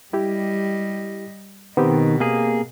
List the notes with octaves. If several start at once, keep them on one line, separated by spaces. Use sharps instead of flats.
G3 E4 G4 D#5
B2 D#3 B3 C4 G4
A#3 G#4